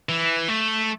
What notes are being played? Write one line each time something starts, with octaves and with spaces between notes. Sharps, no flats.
E3
A3